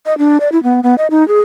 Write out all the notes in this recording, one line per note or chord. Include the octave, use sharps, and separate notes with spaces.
D#5
D4
D5
E4
B3
B3
D#5
D#4
G#4